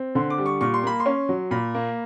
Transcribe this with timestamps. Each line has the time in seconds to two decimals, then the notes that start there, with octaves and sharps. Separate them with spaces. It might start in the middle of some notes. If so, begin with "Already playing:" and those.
Already playing: C4
0.15 D3 C6
0.30 D6
0.38 G3
0.46 C#6
0.61 A#2 C#6
0.74 C6
0.83 A#3 B5
1.00 C6
1.06 C#4
1.29 F#3
1.51 A#2 B5
1.75 A#3